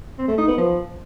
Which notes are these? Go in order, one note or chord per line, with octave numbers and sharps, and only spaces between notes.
C4
A3
D#4
B3
F3